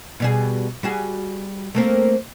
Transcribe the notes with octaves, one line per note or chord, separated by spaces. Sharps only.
B2 G3 G#4
G3 F#4 G#4
A3 A#3 C4